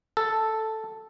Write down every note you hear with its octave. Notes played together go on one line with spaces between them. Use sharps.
A4